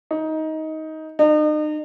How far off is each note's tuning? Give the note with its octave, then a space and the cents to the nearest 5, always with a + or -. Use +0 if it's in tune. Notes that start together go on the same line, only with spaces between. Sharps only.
D#4 +15
D#4 -40